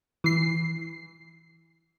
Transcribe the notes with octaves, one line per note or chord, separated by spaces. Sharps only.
E3 C7